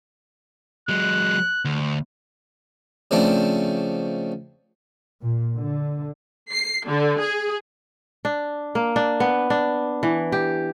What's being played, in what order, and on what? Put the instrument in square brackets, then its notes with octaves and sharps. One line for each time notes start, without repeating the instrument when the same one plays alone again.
[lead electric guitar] F#3 G#3 [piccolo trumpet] F#6
[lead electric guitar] D2
[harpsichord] C#3 F3 A3 C4 D4
[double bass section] A#2
D3
[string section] C7
D3
G#4
[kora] D4
A#3
D4
B3
D4
E3
G4